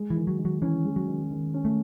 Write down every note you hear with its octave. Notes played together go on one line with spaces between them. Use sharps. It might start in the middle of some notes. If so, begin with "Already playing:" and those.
Already playing: G#3
E3
D#3
F#3
D#3
F#3
E3 C#4
G#3
F#3
D#3
D#3
C#4
A3